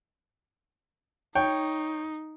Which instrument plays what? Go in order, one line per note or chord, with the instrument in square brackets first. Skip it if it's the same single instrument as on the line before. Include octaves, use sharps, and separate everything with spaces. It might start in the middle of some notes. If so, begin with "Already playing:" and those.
[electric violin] D#4 [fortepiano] C#5 G5